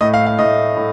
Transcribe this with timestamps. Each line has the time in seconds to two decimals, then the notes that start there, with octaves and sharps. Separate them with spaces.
0.01 A2 A3 D#5
0.14 F5
0.26 F5
0.39 A2 A3 D#5
0.76 A2